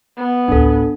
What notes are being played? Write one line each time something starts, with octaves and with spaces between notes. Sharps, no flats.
B3
A1 D2 D4 A4